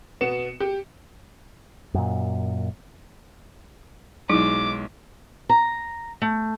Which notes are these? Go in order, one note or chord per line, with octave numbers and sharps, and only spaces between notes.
B2 B3 C#7 E7
G4
F#2 A#2
B1 F#3 G#3 D#4 E4 D6
A#5
A3